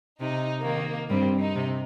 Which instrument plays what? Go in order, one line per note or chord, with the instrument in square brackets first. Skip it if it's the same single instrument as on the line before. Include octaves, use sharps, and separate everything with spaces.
[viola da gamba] C3 [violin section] D#4
[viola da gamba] D#3 [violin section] A#3
[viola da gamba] G2 G3 [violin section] C4
[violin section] D#4
[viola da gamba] C3